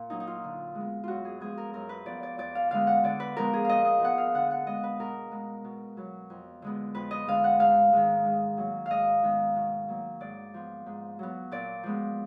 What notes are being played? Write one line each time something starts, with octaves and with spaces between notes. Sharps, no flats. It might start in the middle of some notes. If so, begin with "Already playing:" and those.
Already playing: A#2
F#3 A#3 D#4
D#4
F4
D3
G#3
B3
F#2 F4 F#4
G#4
F3 G#3 B3 G#4
A#4
F#2 A#4
B4
F3 B3 D5
D5
F2 D5
F5
D3 G#3 B3 F5
F#5
D3 D5
B4
F3 G#3 B3 A#4
G#4
A#2 D#5 F5
D#5
F3 B3 F#5
F5
D3 F#5
F#5
G#3 B3 D#5
B4
B2 A#4
G#3 B3
B2
F#3 B3
F2
D3 G#3 B3
F2 B4
D#5
D3 G#3 F5
F#5
G#2 F5
D#3 G#3
G#2
F#3 A#3
G#2 D#5 F5
D#3 G#3 B3
B2
F#3 A#3
G#2 D5
F3 B3
G#2
F#3 B3
A#2 D5
F3 G#3 B3